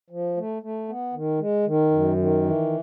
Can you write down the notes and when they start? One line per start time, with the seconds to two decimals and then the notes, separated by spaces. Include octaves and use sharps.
0.10 F3
0.37 A3
0.62 A3
0.89 B3
1.14 D#3
1.39 G#3
1.66 D#3
1.91 F#2
2.17 D#3
2.43 E3